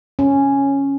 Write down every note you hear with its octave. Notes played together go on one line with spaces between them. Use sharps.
C#4